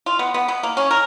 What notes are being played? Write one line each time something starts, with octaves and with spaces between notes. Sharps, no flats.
F4
B3
B3
B3
A#3
C#4
A#4